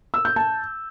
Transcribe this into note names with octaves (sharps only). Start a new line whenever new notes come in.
E6
G6
A5